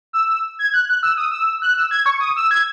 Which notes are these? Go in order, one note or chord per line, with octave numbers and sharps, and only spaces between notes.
E6
E6
G#6
F#6
F#6
E6
D#6
E6
F#6
E6
G#6
C#6
D#6
E6
G#6